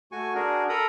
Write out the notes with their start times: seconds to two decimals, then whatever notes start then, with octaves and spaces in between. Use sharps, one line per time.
0.12 A3 F#4 G#5 C#6
0.35 D4 F#4 G#4 A#4
0.69 A4 A#4 A#5 B5 D#6